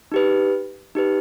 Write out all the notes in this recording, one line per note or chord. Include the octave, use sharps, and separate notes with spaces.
D#4 G4 B4
D#4 G4 B4